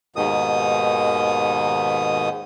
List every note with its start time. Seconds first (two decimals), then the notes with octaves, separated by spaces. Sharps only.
0.16 D#2 G#2 B2 D#3 D#6